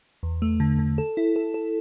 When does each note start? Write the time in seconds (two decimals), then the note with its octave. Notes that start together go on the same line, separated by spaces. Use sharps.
0.23 E2
0.42 A3
0.60 D3
0.79 D3
0.98 A4
1.17 E4
1.36 A4
1.54 A4